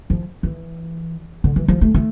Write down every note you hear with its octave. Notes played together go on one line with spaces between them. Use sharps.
F3
E3
D3
E3
F3
A3
A3